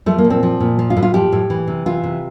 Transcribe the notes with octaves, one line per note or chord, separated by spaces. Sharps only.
F3 A3
A#3
A#2
C4
F3
A#2
F3
F4
A2
F4
F3 G4
A2
E3
C3
E3 F4
C3